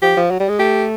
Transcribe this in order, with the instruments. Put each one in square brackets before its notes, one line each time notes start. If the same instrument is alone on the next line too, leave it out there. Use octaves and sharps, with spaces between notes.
[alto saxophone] F3 [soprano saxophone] G4
[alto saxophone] F3
F#3
G3
G#3
[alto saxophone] A3 [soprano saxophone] G4